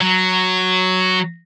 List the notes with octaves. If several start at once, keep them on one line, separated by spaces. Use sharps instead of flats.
F#3